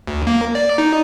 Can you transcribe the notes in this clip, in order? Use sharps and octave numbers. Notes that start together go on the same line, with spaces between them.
D2
A#3
D5
D#4